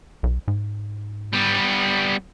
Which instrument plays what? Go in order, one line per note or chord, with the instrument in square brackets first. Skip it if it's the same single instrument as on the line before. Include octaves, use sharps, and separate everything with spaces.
[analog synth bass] B1
G#2
[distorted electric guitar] G3 B3